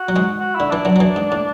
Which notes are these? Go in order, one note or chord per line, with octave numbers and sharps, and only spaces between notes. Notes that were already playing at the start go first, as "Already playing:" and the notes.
Already playing: F#4
F#3
G#2 G#3
F#4
D3 E4
E3 D4
F#2 F#3
F#3
E2 E3
G#2
A2